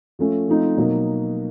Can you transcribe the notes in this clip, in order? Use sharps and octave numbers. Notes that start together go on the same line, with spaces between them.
F3 A3 C#4
F3 A3 C4 D#4
B2 F#3 A#3 D#4